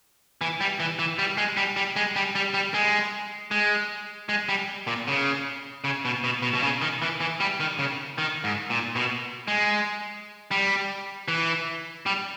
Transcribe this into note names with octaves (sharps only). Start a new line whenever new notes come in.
E3
G3
E3
E3
G3
G#3
G3
G3
G#3
G3
G3
G3
G#3
G#3
G#3
G3
A#2
C#3
C#3
B2
B2
B2
B2
C#3
D#3
E3
E3
G3
D#3
C#3
D#3
G#2
A#2
B2
G#3
G3
E3
G3